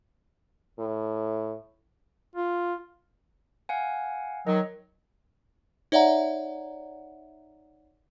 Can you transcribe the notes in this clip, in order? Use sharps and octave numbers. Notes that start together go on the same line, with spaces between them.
A2
F4
F5 F#5 G#5
D#3 F#3 D#5
D#4 C#5 D5 E5 F#5 A#5